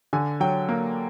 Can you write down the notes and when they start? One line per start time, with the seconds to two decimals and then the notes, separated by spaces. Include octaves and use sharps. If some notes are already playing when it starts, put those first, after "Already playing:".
0.13 D3 G#5
0.40 F#3 G5
0.69 A#3